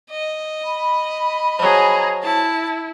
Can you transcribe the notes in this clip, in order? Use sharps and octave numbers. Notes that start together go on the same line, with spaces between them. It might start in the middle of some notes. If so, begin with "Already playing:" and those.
D#5
B5
F3 F#3 G#4 A#5
E4 A5